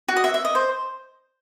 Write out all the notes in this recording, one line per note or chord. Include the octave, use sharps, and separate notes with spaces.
F#4
D#5
E5
E5
D#5
C5